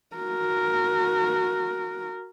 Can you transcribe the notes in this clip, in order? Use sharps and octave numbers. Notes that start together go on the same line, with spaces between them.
F#4 A#4